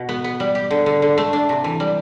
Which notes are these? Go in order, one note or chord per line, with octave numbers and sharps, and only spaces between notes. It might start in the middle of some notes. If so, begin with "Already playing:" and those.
Already playing: B2 F#4
B3
B3
G3
G4
D3
D3
D3
A3
D4
C3
E3
G3